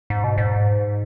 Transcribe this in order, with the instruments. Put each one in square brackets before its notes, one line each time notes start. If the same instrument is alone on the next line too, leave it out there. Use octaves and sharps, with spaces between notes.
[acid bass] G#2
B2
G#2